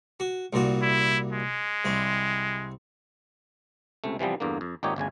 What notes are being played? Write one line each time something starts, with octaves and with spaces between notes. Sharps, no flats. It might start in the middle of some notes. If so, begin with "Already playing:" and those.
F#4
C2 A#2 F#4
E4
G#3
C2 C4
C#2 C3 A3
C3 E3 F3 G3 B3
E2 G2 D3 A#3
F2
G#1 A#2 D#4 G4 C#5
G1 D2 C#3 G#5